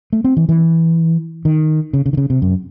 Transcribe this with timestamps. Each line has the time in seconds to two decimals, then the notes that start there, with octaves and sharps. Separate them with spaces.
0.13 A3
0.24 C4
0.37 E3
0.49 E3
1.45 D#3
1.93 C#3
2.06 C#3
2.13 D#3
2.17 C#3
2.30 C3
2.42 F#2